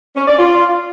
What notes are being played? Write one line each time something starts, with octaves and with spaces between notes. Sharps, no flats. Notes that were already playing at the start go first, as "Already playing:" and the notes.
C#4
D5
F4